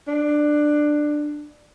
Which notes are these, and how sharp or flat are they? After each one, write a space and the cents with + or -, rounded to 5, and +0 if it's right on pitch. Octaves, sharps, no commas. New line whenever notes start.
D4 +15